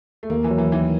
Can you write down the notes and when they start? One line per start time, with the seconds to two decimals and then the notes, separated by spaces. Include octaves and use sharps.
0.23 A3
0.30 D#2 A#3
0.44 E3
0.51 F#3
0.58 E3
0.72 D#3 E3